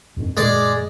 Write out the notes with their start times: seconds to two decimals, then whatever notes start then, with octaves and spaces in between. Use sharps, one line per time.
0.17 F2 G#2 C4
0.37 F#2 A#2 D#3 G#3 D5